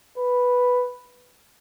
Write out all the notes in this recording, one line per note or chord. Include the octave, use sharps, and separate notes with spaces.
B4